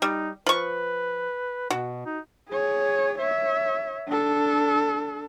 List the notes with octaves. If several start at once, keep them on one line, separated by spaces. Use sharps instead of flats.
G3 D#4
F3 B4 C#6
B2 F#4
D#4
G#4 C#5
C#5 E5
D4 A4